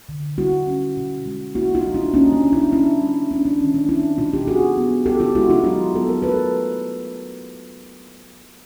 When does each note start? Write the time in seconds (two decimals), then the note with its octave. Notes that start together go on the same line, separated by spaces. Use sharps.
0.09 D3
0.38 G3 E4 F#4
0.67 C#4
0.97 B2
1.26 G#3
1.55 A#3 E4 F#4
1.75 D#4 F4
1.85 G3
1.94 D4 E4
2.14 A#3 C#4 D#4
2.33 D4
2.43 C#4
2.53 D4 E4
2.72 C#4 D4 E4
3.01 G3
3.31 C#4 D4
3.46 D4
3.60 D#3 C#4
3.75 D4
3.89 C4 D4 E4
4.18 B2 D#4 F4
4.33 F4 G4
4.47 B3 F#4 G#4
4.77 B3
5.06 B3 G4 A4
5.20 F4 G4
5.35 G#3 E4 F#4
5.50 D#4 F4
5.64 F#3 D#4 F4
5.94 B3 A4
6.09 A#4
6.22 A3 A4 B4